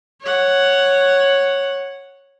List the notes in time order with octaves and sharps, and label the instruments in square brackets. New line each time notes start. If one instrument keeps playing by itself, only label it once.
[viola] C#5 F#5